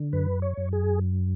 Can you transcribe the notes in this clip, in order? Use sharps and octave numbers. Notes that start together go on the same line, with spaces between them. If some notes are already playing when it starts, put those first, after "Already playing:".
Already playing: D3
F#2 B4
C#5
F#2
G#4